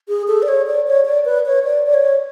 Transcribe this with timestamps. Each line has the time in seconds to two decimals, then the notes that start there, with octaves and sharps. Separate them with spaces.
0.09 G#4
0.28 A4
0.42 D5
0.48 C#5
0.67 D5
0.87 C#5
1.06 D5
1.25 B4
1.46 C#5
1.65 D5
1.86 D5
1.94 C#5